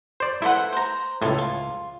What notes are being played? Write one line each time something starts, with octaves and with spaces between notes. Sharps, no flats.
C5 D5
E4 A4 B4 C5 F#5
C5 A#5
C#2 A2 F4 A4 G#5
F4